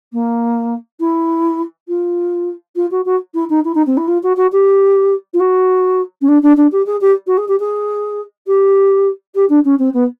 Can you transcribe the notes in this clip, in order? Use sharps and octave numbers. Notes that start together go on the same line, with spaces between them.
A#3
E4
F4
F4
F#4
F#4
E4
D#4
E4
D#4
C4
E4
F4
F#4
F#4
G4
F4
F#4
C#4
D4
D4
D4
G4
G#4
G4
F#4
G#4
G4
G#4
G4
G4
D4
C#4
C4
B3